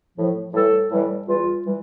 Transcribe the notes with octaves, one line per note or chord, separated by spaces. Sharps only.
A2 F3
A2 E3 G3 A4
A2 E3 G3
E2 E3 G3 F4
E3 G3